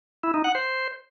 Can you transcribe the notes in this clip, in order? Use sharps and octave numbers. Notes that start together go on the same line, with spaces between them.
E4
D#4
F#5
C5